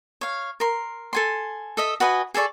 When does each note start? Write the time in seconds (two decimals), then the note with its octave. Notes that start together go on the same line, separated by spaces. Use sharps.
0.21 C#5 F5
0.60 A#4 C6
1.13 A4 G#5 C6
1.77 A4 D#5 E5
2.00 F#4 B4 D#5 G#5
2.34 G#4 A4 D5 C#6